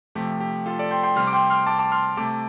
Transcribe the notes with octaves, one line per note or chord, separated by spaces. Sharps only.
C3 F3 A3 G4
G4
F4 A4
A4 D5
G5 C6
G5 C6
C3 G3 C6 F6
D6
G5 C6
C6 F6
A5 D6
A5 D6
C6 F6
C3 A3 A5 D6